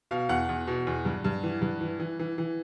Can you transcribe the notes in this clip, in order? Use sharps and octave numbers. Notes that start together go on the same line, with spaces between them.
B2 F5
E2 F#5
E2
B2
E2
G2
G2
E3
G2
E3
E3
E3
E3